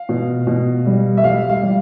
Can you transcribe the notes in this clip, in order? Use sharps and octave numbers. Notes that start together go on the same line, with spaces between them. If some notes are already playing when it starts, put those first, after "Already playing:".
Already playing: F5
B2
B2
G3
E5
G3 F5
F5
G3